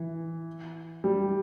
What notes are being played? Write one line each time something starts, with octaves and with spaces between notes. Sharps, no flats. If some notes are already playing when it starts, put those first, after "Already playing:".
Already playing: E3
G3